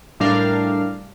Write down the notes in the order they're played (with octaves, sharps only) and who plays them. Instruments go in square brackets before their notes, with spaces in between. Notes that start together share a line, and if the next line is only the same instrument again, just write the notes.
[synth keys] A2 G3 D4 A#4 F5